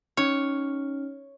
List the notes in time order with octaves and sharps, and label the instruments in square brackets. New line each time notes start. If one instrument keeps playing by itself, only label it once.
[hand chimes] C#4 D#4 F6 [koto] C#5